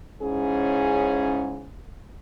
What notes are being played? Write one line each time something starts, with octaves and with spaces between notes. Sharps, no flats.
G#2 C#3 C#4 E4 G#4